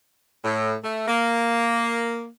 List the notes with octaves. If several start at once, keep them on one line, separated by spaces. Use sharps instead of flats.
A2
A3
A#3